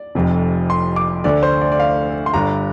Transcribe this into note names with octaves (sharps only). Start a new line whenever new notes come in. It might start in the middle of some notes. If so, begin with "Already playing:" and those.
Already playing: D5
F1 F2 C3
C6
D6
D2 D3 D5
C5
D5
D5
F5
C6
G1 G2 D3 A#5